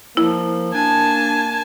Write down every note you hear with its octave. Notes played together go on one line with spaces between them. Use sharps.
F3 A#3 E4
D4 G#5 A5